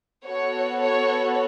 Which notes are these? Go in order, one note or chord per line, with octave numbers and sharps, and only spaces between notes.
B3 F#4 A4 C#5
C#5